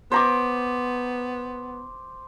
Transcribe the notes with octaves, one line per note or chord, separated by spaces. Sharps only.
B3 C5 A#5 D6